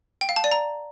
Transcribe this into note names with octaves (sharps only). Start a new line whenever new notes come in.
G5
F5
A5
D5
A#5